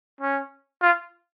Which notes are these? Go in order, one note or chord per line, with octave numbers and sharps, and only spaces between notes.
C#4
F4